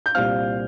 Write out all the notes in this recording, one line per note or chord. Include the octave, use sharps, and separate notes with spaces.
G6
C2 A#2 G3 C4 F5 F6